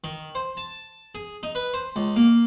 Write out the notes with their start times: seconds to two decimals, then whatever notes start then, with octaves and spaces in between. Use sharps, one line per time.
0.04 D#3
0.35 C5
0.57 A5
1.15 G#4
1.43 D#4
1.55 B4
1.74 C5
1.96 C#2
2.16 A#3